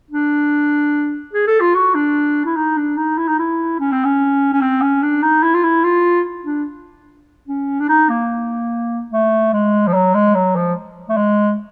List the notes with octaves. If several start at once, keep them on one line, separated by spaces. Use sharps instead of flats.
D4
G#4
A4
F4
F#4
D4
E4
D#4
D4
D#4
E4
D#4
E4
C#4
C4
C#4
C#4
C4
C#4
D4
D#4
E4
F4
E4
F4
D4
C#4
D4
D#4
A#3
A3
G#3
F3
F#3
G#3
F#3
F3
A3
G#3